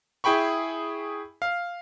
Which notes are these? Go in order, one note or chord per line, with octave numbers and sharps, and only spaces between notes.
E4 G#4 G5 B5 C#6
F5